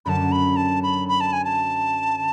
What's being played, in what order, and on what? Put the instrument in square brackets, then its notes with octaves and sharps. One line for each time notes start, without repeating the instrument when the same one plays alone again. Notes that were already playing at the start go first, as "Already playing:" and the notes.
[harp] F#2 D3 F#3 [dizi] A5 B5
[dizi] B5
A5
B5
B5
A5
G#5
A5